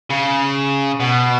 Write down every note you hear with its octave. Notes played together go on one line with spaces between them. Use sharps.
C#3
B2